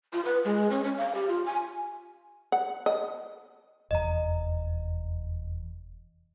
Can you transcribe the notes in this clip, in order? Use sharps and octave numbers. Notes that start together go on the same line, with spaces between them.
F4
B4
G#3
C#4
C#4
F5
G4
F4
G#5
F#5
D#5
F1 E2 D#5 A#5